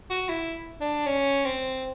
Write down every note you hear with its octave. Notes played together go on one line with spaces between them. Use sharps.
F#4
E4
D4
C#4
C4